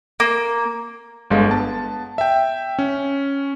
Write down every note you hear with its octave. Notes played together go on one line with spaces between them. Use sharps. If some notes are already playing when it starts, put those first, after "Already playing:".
A#3
G1 D3 G#3 F5
B3 A5
E5 G5
C#4